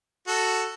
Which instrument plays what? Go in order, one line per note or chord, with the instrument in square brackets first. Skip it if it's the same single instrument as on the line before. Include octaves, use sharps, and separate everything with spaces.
[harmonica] F#4 A4